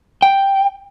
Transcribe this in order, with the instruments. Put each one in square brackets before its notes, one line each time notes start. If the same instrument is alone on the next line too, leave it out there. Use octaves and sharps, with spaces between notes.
[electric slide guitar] G5